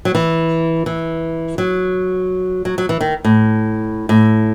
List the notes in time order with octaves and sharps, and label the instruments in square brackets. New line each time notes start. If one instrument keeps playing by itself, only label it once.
[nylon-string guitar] F#3
E3
E3
F#3
F#3
F#3
E3
D#3
A2
A2